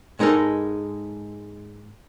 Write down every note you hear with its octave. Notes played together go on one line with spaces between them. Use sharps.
G#2 G#3 D#4 A4 A#4